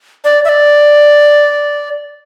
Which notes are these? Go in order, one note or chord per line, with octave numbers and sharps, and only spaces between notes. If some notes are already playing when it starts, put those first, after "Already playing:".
D5
E5
D5